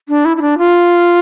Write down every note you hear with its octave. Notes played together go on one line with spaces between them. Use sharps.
D4
E4
E4
D4
F4